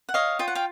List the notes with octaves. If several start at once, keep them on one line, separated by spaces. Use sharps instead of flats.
F#5
C#5 D#5 F5
F4 G5
F#5
F5 G5